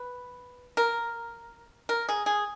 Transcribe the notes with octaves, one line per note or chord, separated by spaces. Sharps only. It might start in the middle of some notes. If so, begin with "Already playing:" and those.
Already playing: B4
A#4
A#4
G#4
G#4